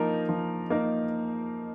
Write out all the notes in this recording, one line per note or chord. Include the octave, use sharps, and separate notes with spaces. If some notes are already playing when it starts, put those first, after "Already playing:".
Already playing: F3 A#3 D#4 A#4
F3
A#3 D#4 A#4